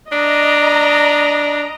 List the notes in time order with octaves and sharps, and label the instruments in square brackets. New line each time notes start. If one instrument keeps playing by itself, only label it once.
[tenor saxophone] D4 [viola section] D#5 A#5